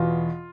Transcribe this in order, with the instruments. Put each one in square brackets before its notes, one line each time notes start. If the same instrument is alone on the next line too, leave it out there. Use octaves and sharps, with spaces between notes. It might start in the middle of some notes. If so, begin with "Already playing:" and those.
Already playing: [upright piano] E2 B2 F4